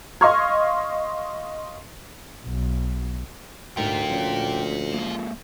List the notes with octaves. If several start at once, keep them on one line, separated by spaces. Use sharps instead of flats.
D#5 F5 C6 C#6 F6 G#6
B1
D2 G#2 F4 A#4 G5
F3 C#4
G#3 A#3